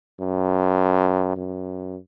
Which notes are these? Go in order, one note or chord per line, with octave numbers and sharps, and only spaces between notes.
F#2
F#2